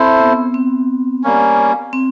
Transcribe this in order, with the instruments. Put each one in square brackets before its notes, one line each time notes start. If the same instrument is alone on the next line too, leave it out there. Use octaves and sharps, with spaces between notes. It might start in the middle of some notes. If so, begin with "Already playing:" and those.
Already playing: [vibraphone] C4 [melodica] E4 A4 C5
[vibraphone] B3
C4
[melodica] G3 A#3 C#4
[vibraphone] C4